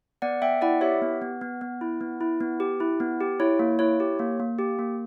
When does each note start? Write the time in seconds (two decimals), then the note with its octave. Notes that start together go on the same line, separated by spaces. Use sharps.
0.22 B3 D5 F#5
0.42 B3 E5 G5
0.61 E4 D5 F#5
0.81 G4 C#5 E5
1.02 B3
1.22 B3
1.41 B3
1.61 B3
1.81 E4
2.01 B3
2.21 E4
2.41 B3
2.60 G4
2.80 E4
3.00 B3
3.20 G4
3.40 E4 C#5
3.59 A#3
3.79 E4 C#5
4.00 G4
4.19 A#3
4.40 A#3
4.59 G4
4.79 A#3